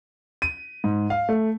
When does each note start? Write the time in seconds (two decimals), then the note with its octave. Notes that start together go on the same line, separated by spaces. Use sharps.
0.42 D#7
0.84 G#2
1.10 F5
1.29 A3